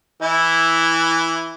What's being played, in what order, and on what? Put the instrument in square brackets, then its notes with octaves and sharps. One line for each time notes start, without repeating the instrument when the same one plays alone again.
[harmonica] E3 E4